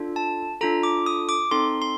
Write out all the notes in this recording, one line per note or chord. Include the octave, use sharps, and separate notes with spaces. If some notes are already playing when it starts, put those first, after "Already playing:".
Already playing: D4 F4 A4
A5
D4 F4 A4 A#5
D6
D#6
D6
C4 D#4 A4 C6
C6